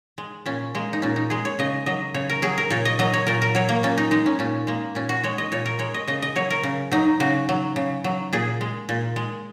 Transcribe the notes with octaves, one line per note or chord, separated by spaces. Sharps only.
G#3
A#2 C#4
G#3 A#3
D#4
A#2 C#4
D#4
G#3 G#4
C#5
C#3 D#5
F#3 D#5
C#3 C#5
A#4
F#3 G#4
A#4
A#2 C#5
D#5
F#3 D#5
C#5
A#2 A#4
A#4
F#3 C#5
A#3
A#2 C#4
D#4
G#3 D#4
C#4
A#2 C#4
G#3 A#3
A#2 C#4
F#4
G#3 C#5
D#5
A#2 C#5
A#4
G#3 C#5
D#5
C#3 D#5
D#5
F#3 C#5
A#4
C#3
F#3 D#4
C#3 F#4
F#3
C#3
F#3
A#2 G#4
G#3
A#2
G#3